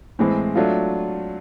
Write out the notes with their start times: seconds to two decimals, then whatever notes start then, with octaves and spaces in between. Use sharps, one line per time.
0.19 A2 E3 G#3 C4
0.55 F#3 A3 D4 F4